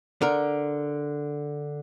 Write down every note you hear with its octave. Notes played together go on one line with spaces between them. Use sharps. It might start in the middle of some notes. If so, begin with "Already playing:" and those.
D3 A#4